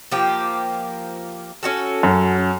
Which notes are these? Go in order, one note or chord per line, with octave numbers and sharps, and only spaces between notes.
F3 A#3 G4
C#4 F#4 A4
F#2